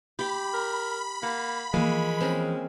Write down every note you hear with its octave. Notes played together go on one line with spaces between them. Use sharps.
G4 G5 B5
A#4
A#3 F#5
E3 F3 G#3 A#3
C4 C#4 A#4